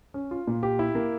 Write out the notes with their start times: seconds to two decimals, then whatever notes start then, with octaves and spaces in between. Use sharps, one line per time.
0.14 C#4
0.31 F4
0.47 A#2
0.63 G4
0.79 E4
0.95 A#3